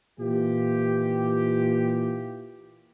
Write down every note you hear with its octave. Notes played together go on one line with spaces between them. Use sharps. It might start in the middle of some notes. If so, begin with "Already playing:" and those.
A#2 E3 F4 G4